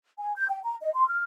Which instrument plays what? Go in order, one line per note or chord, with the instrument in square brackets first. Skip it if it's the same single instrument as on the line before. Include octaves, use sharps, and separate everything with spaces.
[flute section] G#5
G6
G5
A#5
D#5
C6
F6